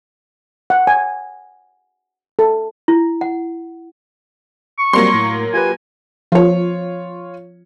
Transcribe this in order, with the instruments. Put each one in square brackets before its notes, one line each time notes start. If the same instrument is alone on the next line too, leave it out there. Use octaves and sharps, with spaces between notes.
[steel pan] F#5
G#5
A4
[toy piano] E4
F#5
[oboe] C#6
[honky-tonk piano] F#3 A#3 C6 [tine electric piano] G3 C4
[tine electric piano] A2
[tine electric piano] F4 G4 B4 [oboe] G#5
[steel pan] F3 [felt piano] F4 C#5